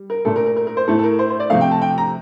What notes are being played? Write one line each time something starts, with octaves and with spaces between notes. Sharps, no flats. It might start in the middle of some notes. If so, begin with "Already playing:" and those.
Already playing: G3
A#4
A#2 A3 A4
A#4
A#4
A#4
A#4
C5
A2 A3 A4
A4
A#4
C5
C5
D5
C3 F3 A3 F5
G5
A5
G5
A#5